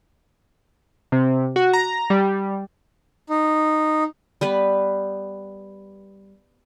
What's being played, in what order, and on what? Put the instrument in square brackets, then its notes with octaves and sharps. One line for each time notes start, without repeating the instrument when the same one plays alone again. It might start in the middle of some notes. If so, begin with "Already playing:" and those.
[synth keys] C3
F#4
A#5
G3
[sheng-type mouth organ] D#4
[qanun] G3 B3 B4